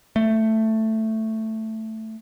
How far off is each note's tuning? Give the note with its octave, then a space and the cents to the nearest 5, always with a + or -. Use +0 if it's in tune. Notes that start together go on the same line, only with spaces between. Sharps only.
A3 +5